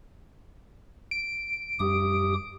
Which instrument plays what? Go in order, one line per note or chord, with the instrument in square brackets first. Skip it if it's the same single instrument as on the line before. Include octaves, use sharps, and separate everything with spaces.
[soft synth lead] D7
[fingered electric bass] F#2 G3 [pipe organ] G4 D#6